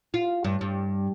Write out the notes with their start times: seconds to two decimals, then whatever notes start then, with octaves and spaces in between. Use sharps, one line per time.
0.14 F4
0.44 G2
0.61 G2